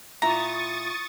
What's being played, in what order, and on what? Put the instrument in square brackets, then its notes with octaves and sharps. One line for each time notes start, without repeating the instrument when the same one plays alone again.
[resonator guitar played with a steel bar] A#2 E4 [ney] F4 [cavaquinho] A#5 [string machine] C#6 D#6 A6